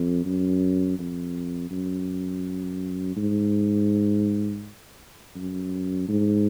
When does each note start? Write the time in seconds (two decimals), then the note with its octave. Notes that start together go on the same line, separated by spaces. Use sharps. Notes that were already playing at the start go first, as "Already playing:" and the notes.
Already playing: F2
0.25 F#2
0.99 F2
1.71 F#2
3.16 G#2
5.36 F#2
6.09 G#2